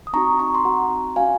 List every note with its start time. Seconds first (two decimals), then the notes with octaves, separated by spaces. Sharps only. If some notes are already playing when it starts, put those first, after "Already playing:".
0.07 D#6
0.13 C4 D#4 F#4 A#5 C#6
0.39 A#5 C#6
0.54 C6
0.65 C4 D#4 F#4 F#5 A#5
1.16 C#4 F#4 F5 G#5